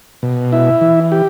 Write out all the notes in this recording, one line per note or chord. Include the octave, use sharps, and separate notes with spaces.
B2
E4
E3
G4